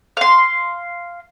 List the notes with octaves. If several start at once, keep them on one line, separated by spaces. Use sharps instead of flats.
F5 C6